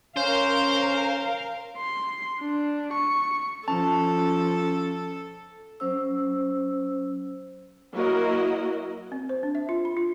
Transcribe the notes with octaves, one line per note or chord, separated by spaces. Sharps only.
C#4 A#4 C5 F5
C6
D4
C#6
F3 C#4 A4 A5
F#3 C#4 C5 E6
F#3 A#3 E4 F#4 A#4 D#5
C4
C5
D4
E5
F4
B5
F4